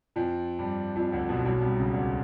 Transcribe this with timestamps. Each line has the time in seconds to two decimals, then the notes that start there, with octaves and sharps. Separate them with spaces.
0.16 F2 F3
0.59 G2 G3
0.96 F2 F3
1.12 D2 D3
1.29 B1 B2
1.45 B1 B2
1.61 C2 C3
1.77 C#2 C#3
1.93 D2 D3